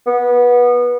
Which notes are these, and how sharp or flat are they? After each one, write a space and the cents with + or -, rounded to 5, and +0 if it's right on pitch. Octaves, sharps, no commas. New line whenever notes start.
B3 -20